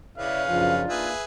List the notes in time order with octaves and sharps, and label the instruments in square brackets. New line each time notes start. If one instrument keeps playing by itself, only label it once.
[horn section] C#3 [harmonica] C#4 B4 [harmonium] E4 D5 E5 [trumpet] F5
[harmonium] F#2 C#3 F3 [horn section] D4 D#4 F4
[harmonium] A#3 [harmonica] G#4 B4 E5